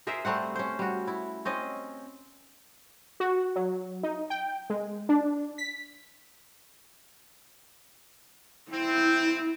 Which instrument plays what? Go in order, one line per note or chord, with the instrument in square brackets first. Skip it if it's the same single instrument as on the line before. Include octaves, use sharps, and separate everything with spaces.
[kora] G#4 A#4 C5 E5
G3 A3 C4 F#5
C#4 C5
G3 F#4
E4
C4 C#4 D#5
[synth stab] F#4
F#3
D#4
G5
G#3
D4
B6
[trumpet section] C4 [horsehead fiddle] E4